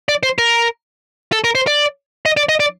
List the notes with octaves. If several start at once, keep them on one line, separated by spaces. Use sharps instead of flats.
D5
C5
A#4
A4
A#4
C5
D5
D#5
D5
D#5
D5